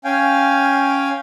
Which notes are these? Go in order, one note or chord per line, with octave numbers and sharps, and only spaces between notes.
C#4 F5 G5 G#5